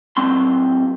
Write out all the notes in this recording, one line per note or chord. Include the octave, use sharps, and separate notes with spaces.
A#2 F#3 C4 C6